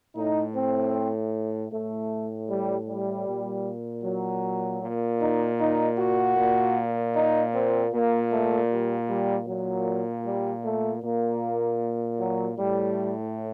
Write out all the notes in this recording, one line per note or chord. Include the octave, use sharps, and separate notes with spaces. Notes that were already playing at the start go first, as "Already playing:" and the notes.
A2 D#4
C4
A2 A3
G3
G3
A#2
F#3
A#2
D#4
D#4
F#4
A#2
D#4
C4
A#2 A#3
A3
G3
G3
A#2 F#3
G3
A3
A#2 A#3
F#3
A2 G3